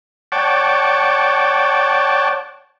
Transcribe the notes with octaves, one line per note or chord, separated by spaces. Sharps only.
C#5 D5 F#5 G5 A5